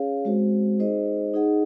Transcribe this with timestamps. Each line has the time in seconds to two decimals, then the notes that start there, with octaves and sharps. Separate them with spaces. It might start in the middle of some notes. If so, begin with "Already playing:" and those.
Already playing: C#4 G#4 C#5 F5
0.25 G#3 C4 F#4 C5
0.79 D#4 G#4 C5 D#5
1.34 D#4 G#4 D#5 F#5